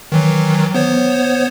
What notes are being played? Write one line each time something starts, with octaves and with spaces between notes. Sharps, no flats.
D#3 E3 F#3
B3 C5 C#5